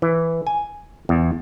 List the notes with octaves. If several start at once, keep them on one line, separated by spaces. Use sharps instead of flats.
E3
G#5
E2